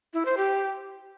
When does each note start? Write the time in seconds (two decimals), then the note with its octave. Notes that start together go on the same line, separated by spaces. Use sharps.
0.14 E4
0.25 C5
0.37 G4